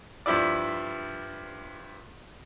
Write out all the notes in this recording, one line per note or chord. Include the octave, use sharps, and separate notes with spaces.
G2 F3 E4 D5